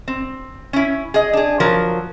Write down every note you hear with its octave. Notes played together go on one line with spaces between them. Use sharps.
C4
C#4 E4
G#4 D#5
D4 G#4
F3 F#3 A#4